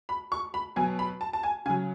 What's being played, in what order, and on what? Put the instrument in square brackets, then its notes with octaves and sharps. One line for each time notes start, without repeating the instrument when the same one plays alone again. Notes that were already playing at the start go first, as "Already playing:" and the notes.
[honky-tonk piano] B5
C#6
B5
B2 F#3 G#5
B5
A5
A5
G#5
C#3 G#5
F#3